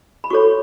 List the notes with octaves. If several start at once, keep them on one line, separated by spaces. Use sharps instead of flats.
B5
F#4 A4 C#5 C#6